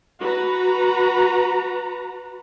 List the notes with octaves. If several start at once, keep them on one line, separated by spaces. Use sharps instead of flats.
F#4 B4 A#5